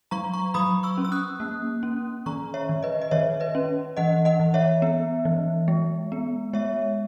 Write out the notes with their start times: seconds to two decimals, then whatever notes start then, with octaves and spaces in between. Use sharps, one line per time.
0.11 F#3 A#5 C#6
0.33 A#5 C#6
0.54 F#3 B5 D#6
0.83 C#6 E6
0.98 C#4
1.05 E6
1.12 D#6 F#6
1.40 A#3
1.83 C#4
2.26 D#3 A#5 C#6
2.54 C#5 E5
2.69 D#3
2.83 B4 D#5
3.02 D#5
3.11 D#3 C#5 E5
3.40 B4 D#5
3.55 C#4
3.97 E3 D#5 F#5
4.25 D#5 F#5
4.40 E3
4.54 C#5 E5
4.82 B3
5.25 E3
5.68 G#3
6.12 B3
6.53 G#3 C#5 E5